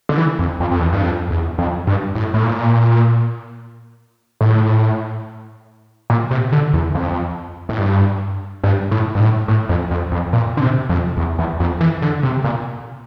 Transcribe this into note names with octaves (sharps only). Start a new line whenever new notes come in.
D3
E3
F2
F2
F2
E2
G2
F2
E2
F2
G2
A2
A2
A#2
A2
A#2
C3
D3
E2
F2
A2
G2
G2
A2
G2
A2
A2
F2
F2
F2
A#2
D3
C3
F2
E2
E2
F2
E3
D3
C3
A#2